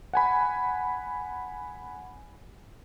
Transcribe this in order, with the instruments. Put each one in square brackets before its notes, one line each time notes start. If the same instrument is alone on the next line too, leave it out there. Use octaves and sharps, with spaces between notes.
[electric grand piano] F#5 G#5 B5